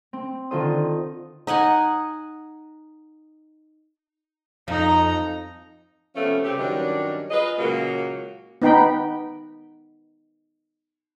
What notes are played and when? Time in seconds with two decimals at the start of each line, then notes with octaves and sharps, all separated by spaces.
0.13 C4
0.51 D3 D#3 F4 A4 C5 D#6
0.70 D#6
1.47 D#4 D#5 F#5 G#5
4.68 F2 D#4 A#5
6.15 C3 F3 A3 B3 C#4
6.44 G2 C#3 C4 G4
6.58 G2 D#3 F#3 C#4 D4
7.30 F4 G#4 B4 D#5
7.57 A#2 C#3 F#3 G#3 A#3
8.62 B3 D#4 G5 B5